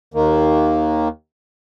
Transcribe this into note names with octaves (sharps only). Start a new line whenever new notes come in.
D#2 D#3 A#3